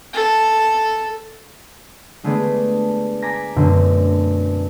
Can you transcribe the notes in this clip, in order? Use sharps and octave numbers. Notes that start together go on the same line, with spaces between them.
A4
D3 G#3 A3 B3 G#4 D5
G#5 A#5 D6 A#6 B6
F#2 B2 D3 A3 C4